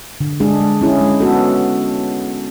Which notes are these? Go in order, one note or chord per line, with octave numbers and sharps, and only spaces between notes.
D3
G#3 D4 G#4
G#3
C#4 E4 G#4
G#3
B3 F#4 A4